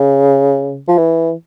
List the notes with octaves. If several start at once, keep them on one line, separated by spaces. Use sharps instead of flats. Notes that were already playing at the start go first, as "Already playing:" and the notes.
Already playing: C#3
F3
E3